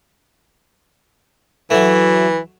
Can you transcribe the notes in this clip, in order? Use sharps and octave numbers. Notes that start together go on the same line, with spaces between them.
E3 F#3 A3